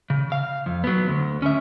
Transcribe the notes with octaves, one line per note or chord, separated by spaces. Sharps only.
C#3
F5
F2
F#3 B3
D2
C#4 E5